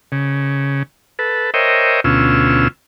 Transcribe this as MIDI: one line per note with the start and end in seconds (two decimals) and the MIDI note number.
0.12 0.83 49
1.19 1.51 69
1.19 1.51 71
1.54 2.00 70
1.54 2.00 72
1.54 2.00 73
1.54 2.00 75
1.54 2.00 76
1.54 2.00 79
2.04 2.68 38
2.04 2.68 47
2.04 2.68 61
2.04 2.68 65
2.04 2.68 88